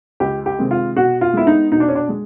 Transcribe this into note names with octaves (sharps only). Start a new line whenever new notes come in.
C#2 G4
G4
C3 D#3 G#3 C4
F4
B2 F#4
F4
G#3 B3 E4
D#4
B2 D#4
D4
C#4
D4
G#3